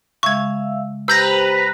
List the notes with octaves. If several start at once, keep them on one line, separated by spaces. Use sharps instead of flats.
C#3 G#3 E5 F5 C#6 E6 G#6
G4 B4 C5 G5 A#5 E6 G6 A#6